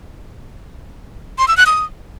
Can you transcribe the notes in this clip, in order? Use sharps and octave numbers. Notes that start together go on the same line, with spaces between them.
C6
E6
F#6
D#6